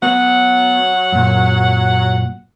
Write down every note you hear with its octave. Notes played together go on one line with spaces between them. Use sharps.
F#3 B3 F#5
F#2 A#2